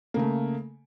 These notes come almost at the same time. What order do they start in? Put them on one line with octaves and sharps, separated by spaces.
A#3 C#3 A3